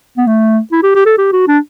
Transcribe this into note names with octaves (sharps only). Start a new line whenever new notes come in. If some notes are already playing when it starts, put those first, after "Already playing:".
B3
A3
E4
G4
G4
A4
G4
F#4
D4